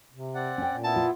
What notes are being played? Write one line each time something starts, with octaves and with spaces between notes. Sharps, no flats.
C3
C4 D5 F#5
C#4 G5
A#2
B3 E4 A5
F4